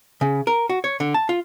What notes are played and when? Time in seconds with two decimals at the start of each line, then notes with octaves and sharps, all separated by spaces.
0.21 C#3
0.47 A#4
0.69 F#4
0.84 C#5
1.00 D3
1.14 A5
1.29 F4